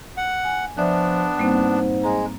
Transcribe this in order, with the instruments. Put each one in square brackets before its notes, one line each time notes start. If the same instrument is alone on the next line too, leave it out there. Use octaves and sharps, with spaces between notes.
[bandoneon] F#5
[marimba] G#5
[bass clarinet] F3 [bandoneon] B3 D4 [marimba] D5 E5 F#6
[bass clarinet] G#2 [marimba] G3 A#3 C4
[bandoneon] G#3 [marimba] A#5